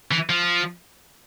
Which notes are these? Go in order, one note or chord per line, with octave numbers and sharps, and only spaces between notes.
E3
F3